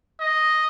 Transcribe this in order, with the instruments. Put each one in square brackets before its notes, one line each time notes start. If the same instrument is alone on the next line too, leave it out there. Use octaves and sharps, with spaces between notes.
[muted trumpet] D#5